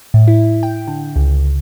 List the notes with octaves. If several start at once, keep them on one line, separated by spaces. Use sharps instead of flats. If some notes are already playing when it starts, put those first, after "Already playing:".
A2
E4
G5
D3
C#2